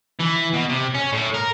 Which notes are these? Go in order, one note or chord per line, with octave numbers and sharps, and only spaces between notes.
E3
B2
C3
C#4
A2
A#4